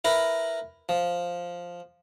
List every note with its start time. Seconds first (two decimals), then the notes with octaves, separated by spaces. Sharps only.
0.05 E4 A#4 B4
0.89 F3